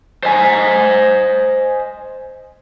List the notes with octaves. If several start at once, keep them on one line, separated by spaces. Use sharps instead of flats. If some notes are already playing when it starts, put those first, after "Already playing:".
C5 D#5 G#5